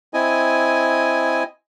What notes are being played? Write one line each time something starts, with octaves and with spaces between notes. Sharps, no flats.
C4 E4 D#5 G#5